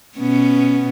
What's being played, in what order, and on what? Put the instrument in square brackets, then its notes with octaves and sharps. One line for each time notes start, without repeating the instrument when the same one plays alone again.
[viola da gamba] B2 B3 C#4